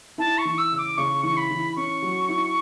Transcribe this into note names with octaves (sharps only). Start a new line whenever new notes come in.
E4 A5
C#6
E3
E6
C#3
D6
C#3 C#6
E3 C#6
B5
E3
C#4 C#6
F#3
E4